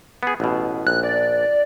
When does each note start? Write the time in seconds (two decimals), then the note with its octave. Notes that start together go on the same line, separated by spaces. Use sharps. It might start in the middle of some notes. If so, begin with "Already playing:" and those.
0.23 B3 G#4
0.40 A1 B2
0.87 A#1 F#6
1.03 D5